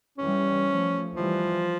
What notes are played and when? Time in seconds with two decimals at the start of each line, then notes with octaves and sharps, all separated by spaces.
0.18 E3 G3 C#4
0.67 F3 A3
1.14 E3 F3 G3